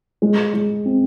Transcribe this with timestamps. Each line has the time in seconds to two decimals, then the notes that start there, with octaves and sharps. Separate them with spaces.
0.22 G#3
0.54 G#3
0.85 C4